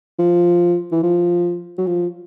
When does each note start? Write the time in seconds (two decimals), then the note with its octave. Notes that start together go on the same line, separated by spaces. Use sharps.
0.19 F3
0.92 E3
1.03 F3
1.78 F#3
1.87 F3